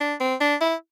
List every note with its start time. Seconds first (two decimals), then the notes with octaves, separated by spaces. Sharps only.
0.01 D4
0.20 C4
0.41 D4
0.61 E4